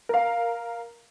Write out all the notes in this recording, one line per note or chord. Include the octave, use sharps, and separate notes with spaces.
A#4 F5